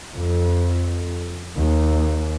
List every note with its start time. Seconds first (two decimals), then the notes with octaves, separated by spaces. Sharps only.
0.15 F2
1.57 D#2